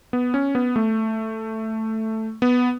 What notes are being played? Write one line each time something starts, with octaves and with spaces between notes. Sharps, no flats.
B3
C#4
B3
A3
B3